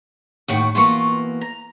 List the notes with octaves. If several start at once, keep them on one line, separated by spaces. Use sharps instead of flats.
D#2 A2 D#3 F#4
B2 E3 A#3 F4 C#6
A#5